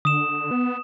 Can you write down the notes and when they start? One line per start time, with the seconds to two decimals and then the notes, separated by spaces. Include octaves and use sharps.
0.05 D3 D#6 E7
0.51 B3